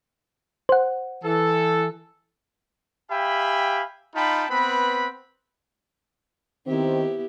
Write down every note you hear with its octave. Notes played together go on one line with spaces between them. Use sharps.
C5 F#5
E3 A4
G4 E5 F5 G5 G#5 B5
D#4 F4 G5 A5 B5
B3 C4 B4 B5
D#3 B3 C4 E4 G4